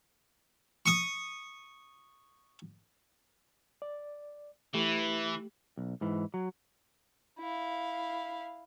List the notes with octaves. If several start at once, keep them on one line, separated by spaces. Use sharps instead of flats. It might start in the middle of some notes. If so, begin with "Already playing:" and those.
C#6 D#6
D5
E3 A3 E4 G4
B1
G#2 E3
F#3
E4 F5